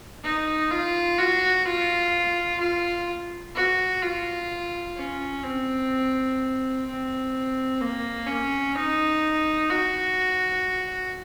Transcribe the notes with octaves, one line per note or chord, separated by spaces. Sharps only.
D#4
F4
F#4
F4
F4
F#4
F4
C#4
C4
C4
A#3
C#4
D#4
F#4